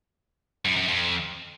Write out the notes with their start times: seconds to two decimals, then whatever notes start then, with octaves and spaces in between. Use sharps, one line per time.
0.65 F#2
0.77 F#2
0.88 F2